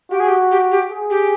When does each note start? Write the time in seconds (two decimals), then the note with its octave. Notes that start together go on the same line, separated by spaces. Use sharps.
0.10 F#4 G4
0.20 G#4
0.28 G4
0.51 G4
0.71 G4
0.90 G#4
1.10 G4